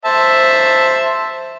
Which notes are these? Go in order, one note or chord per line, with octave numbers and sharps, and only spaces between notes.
C5 E5 A5